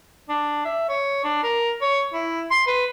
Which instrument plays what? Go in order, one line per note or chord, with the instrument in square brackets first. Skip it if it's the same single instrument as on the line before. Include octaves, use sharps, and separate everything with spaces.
[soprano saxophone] D4
E5
C#5
D4
A#4
C#5
E4
C6
B4